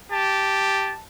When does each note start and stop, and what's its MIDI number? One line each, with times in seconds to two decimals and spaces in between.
0.12 0.95 67
0.12 1.01 81